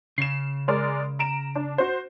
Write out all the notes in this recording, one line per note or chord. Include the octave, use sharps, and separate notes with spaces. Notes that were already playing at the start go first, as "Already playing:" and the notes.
C#3 C7 E7
G#3 A#4 D5
A#5 D7 E7
D4
F#4 C5